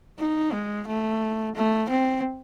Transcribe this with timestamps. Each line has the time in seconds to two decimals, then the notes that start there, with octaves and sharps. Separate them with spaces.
0.18 D#4
0.52 G#3
0.87 A3
1.55 A3
1.89 C4